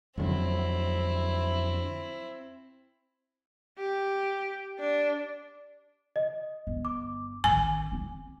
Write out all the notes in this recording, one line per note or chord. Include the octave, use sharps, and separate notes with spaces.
F2 D3 F#3 C4 E4
G4
D4
D#5
G1
D6
A1 D#3 G#5
C4 F4